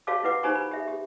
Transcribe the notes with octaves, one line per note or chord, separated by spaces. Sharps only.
F#4 G4 C#5 F5 A5 D6
E4 F4 B4 F#5 D6
D#4 G4 C5 G#5 A#5 C#6
B5
G4 E5
G4